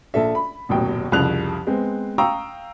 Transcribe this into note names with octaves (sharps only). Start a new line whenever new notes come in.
A#1 A4 E5
B5
D#1 A1 F#2 B2 G5
C2 F2 C#3 F#6 F7
G#3 B3 C4
F5 G5 A#5 C#6 D#6 E6